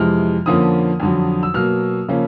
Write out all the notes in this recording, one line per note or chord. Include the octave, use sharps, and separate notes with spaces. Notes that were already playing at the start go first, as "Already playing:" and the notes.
Already playing: F2 C3 E3 G#3 F6
F2 D3 F3 A#3 C#4 D#6
F2 D3 F#3
E6
B2 F#3 A#3 F6
C#3 F3 A#3 C#4